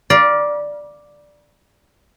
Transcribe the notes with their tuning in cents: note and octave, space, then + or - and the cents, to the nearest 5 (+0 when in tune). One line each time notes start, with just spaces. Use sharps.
D5 +0 F5 +0 A#5 +45